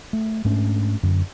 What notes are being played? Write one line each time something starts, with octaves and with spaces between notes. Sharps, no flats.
A3
G#2 A3 C#4 D4
F#2 D3